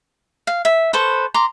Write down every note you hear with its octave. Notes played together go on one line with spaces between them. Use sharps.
F5
E5
A4 B4 C5 C#6
A#5 C6 D6